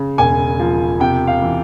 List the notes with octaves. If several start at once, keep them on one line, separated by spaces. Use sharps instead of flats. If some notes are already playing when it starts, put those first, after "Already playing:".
Already playing: C#3
E1 G#5
F3
C3 G5
F5
E3